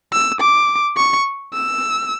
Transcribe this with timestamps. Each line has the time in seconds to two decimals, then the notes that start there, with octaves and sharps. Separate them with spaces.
0.13 E6
0.40 D6
0.97 C#6
1.53 E6